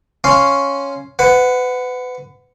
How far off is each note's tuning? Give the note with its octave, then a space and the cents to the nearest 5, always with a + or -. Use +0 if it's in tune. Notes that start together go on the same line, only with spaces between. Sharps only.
C#4 +0 F5 +0 C6 +0
B4 +30 F#5 +0